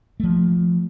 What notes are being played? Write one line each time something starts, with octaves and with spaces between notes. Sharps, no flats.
F3 A3